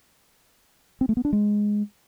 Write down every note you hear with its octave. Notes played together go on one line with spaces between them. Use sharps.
C4
A3
B3
D4
G#3